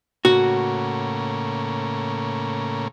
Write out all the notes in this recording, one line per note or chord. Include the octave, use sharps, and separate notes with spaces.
A2 C#3 A#3 F#4